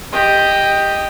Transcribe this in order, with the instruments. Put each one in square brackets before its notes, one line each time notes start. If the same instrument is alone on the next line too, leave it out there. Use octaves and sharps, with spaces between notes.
[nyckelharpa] G4 D#5